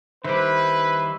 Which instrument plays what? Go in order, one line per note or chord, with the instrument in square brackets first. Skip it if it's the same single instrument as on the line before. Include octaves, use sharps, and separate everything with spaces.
[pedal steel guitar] D#3 G3 [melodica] E4 E5 C6 [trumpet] B4 [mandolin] C5 D6